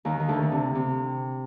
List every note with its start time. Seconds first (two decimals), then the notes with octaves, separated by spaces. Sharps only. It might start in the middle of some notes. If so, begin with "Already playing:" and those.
0.05 D#2 D#3
0.20 D#3
0.28 D2 D3
0.42 D3
0.52 C3
0.75 C3